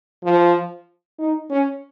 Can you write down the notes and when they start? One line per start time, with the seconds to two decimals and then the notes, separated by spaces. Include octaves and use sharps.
0.24 F3
1.19 D#4
1.50 C#4